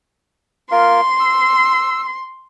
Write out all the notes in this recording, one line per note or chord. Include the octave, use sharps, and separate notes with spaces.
A#3 F4 A#4 C6
E6